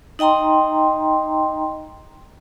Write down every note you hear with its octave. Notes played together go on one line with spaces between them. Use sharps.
D#4 D#5 G5 A#5 C6